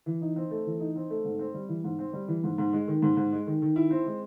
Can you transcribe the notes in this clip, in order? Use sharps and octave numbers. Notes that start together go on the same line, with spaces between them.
E3
D#4
C4
A3
E3
D#4
C4
A3
G#2
C4
G3
E3
G#2
C4
G3
E3
G#2
G#2
G#3
D#3
G#2
G#2
G#3
D#3
D#3
E4
C4
G#3